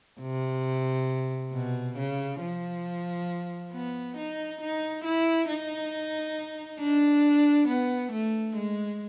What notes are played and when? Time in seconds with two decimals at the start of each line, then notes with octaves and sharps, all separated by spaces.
0.21 C3
1.53 B2
1.97 C#3
2.41 F3
3.72 B3
4.17 D#4
4.61 D#4
5.05 E4
5.48 D#4
6.79 D4
7.68 B3
8.12 A3
8.56 G#3